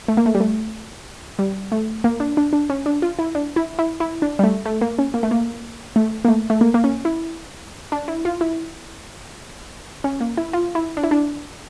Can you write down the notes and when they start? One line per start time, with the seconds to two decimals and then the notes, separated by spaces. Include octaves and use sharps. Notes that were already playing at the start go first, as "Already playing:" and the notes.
0.08 A3
0.17 A#3
0.26 A3
0.35 G3
0.40 A3
1.39 G3
1.72 A3
2.04 A#3
2.20 D4
2.37 D4
2.53 D4
2.70 C#4
2.86 D4
3.02 F4
3.19 E4
3.35 D4
3.56 E4
3.79 E4
4.00 E4
4.22 D4
4.39 G3
4.44 A3
4.65 A3
4.81 A#3
4.99 C#4
5.14 A#3
5.23 A3
5.31 A#3
5.96 A3
6.25 A#3
6.28 A3
6.50 A3
6.61 A#3
6.74 A#3
6.84 C#4
7.05 E4
7.92 D4
8.08 E4
8.25 F4
8.41 E4
10.04 C#4
10.21 A#3
10.37 E4
10.53 F4
10.75 E4
10.97 D4
11.03 E4
11.11 D4